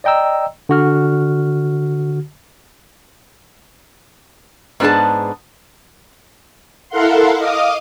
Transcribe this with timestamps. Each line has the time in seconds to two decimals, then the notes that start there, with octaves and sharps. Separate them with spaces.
0.04 D5 D#5 G5 A#5 E6
0.69 D3 F#4 F6
4.80 G#2 B3 D4 G4 G#4 A5
6.89 E4 A4 A#4 F5 F#5 C6
7.36 D#5 F5 D6 D#6